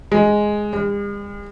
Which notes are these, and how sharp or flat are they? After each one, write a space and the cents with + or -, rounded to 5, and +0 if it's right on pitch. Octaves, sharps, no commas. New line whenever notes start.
G#3 +5
G#3 -45